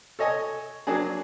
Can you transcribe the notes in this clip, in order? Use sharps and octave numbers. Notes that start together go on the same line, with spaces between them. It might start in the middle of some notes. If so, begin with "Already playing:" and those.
A4 C#5 D#5 G#5
F#3 A#3 D4 G#4